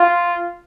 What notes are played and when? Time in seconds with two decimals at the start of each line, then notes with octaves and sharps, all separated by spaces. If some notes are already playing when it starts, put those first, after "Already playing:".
Already playing: F4